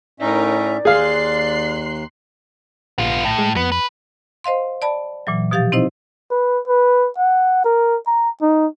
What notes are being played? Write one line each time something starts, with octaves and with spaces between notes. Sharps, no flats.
A2 C#4 D#4 A#4 D5 E5
D#2 G#4 F5 C6 F#6 C7
A#1 B3 F4
A2
G#3
F2 B3
B4
C5 D#5 F5 C6
D5 A5 B5
A#2 E3 F#3
B2 F3 G4 F5 A6
C4 D#4 E4 C5 D#5
B4
B4
F#5
A#4
A#5
D#4